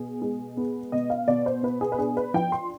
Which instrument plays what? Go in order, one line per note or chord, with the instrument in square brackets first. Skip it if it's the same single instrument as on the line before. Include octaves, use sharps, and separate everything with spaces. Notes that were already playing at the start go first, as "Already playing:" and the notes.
Already playing: [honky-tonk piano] B2 G#4
G#3
B3
B2 D#5
F5
B2 D5
C5
B3 B4
G#4
B4
D4 G#4
B4
F3 G5
C6